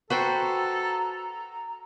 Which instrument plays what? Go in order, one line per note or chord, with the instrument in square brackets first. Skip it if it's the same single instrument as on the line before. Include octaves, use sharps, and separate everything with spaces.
[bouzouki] F#4 [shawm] A4 [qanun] B4 C5 G5 [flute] A#5